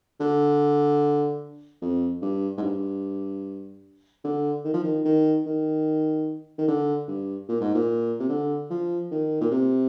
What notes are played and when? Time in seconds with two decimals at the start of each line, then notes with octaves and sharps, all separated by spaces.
0.20 D3
1.82 F2
2.22 G2
2.58 G#2
2.62 G2
4.24 D3
4.65 D#3
4.74 F3
4.84 D#3
5.05 D#3
5.46 D#3
6.58 D#3
6.68 D3
7.08 G2
7.49 A#2
7.61 G#2
7.74 A#2
8.20 C3
8.29 D3
8.70 F3
9.11 D#3
9.41 A#2
9.51 C3